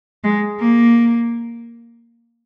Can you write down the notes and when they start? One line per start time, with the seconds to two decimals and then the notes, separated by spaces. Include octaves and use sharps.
0.24 G#3
0.60 A#3